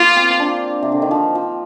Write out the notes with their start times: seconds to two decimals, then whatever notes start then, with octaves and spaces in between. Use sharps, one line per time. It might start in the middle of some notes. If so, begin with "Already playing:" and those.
Already playing: A#3 F4
0.16 C4
0.40 D4
0.82 C3
0.92 D3
1.02 D#3
1.11 F3
1.35 F3